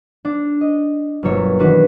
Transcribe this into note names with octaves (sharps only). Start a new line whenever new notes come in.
D4
D#5
G1 B2 F#3 A#3 C#5 E5
D#3 E3 D4 F#4 B4